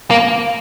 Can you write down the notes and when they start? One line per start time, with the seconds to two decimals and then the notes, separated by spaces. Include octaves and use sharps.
0.11 A#3